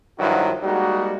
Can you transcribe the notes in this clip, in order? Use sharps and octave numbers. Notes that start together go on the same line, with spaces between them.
G2 D#3 F3 F#3 E4 F#4
G3 G#3 A#3 D#4 F#4